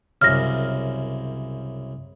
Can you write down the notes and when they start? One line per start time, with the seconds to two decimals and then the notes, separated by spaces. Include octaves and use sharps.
0.22 C2 F#2 C#3 F6 A#6